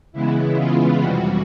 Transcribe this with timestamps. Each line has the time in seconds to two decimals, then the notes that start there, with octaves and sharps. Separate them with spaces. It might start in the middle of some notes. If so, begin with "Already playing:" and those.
0.13 C#3 E3 G#3 B3 E4
0.56 F4
1.00 F2 C3 E3 G3 F#4